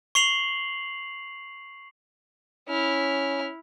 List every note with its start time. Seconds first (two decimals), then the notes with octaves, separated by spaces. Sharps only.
0.15 C#6 C7 F7 F#7
2.69 C#4 E4 F6